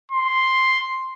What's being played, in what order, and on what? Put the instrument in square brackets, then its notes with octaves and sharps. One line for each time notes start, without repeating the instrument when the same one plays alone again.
[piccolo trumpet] C6